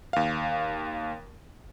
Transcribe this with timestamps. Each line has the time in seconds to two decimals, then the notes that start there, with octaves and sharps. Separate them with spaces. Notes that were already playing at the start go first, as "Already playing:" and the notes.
0.13 D#2 F5